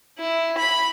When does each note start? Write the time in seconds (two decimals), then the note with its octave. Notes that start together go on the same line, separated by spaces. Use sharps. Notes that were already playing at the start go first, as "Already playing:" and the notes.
0.18 E4
0.58 B5